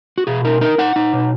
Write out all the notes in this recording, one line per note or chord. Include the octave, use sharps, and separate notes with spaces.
F#4
B2 G#4
D#4 A#4
D#4 A#4
D#4 F#5
D#4
B2